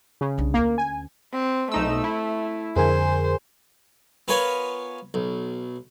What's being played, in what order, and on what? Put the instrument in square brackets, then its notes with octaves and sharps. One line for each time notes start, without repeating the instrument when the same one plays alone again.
[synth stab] C#3
[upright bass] C2 D4
[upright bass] D2 C#4 [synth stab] A#3
[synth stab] G#5
[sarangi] C4
[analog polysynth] B1 D#4 E6 [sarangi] A3
[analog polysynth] E4
[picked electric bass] F2 D3 [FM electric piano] G#4 A#4 G#5 [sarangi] C5
[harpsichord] B3 F4 A#4 B4 C#5 G#5
B1